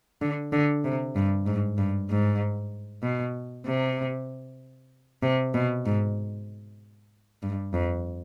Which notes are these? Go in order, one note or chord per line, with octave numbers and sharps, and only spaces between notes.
D3
D3
C3
G2
G#2
G2
G#2
B2
C3
C3
B2
G#2
G2
F2